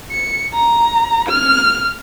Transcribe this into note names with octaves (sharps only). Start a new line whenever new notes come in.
C#7
A#5
F6